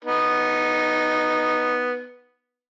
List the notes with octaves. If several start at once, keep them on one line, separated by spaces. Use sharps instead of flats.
B3 D#4